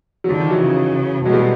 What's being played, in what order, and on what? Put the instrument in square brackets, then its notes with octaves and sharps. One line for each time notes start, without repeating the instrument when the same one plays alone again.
[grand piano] F#3
[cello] D3 [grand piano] D#3 F3
[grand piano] D#3 F3
E3 F#3
[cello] C#3
[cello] B2 [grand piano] F#3 G#3
[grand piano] G3 A3